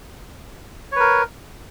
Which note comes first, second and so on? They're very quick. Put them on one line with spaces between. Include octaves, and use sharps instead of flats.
C#5 B4 A#4